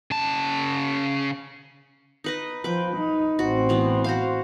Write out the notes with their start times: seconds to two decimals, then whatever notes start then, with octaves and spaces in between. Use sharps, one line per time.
0.11 C#3 A5
2.24 D#4 B4 D#5
2.64 F3 B4 G5
2.97 D#4
3.39 A1 C4 F#4
3.69 B2 E3 B3
4.04 F#4 C5 F5